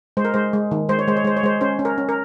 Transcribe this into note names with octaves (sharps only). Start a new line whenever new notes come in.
G#3 C5
A#4
G#3 C5
G#3
D#3
G#3 C5
C#5
G#3 C5
C#5
G#3 C5
C#5
G#3 C5
C#4 C5
C#4
A#4
C#4
A#4